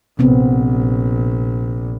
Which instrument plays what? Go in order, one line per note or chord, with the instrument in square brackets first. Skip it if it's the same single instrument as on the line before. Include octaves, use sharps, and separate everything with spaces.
[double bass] A#1 [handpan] C3 B3 C4